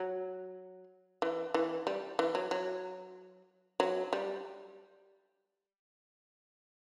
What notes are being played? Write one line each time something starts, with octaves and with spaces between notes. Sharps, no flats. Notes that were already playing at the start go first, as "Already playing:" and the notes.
Already playing: F#3
E3
E3
G3
E3
F#3
F#3
F#3
G3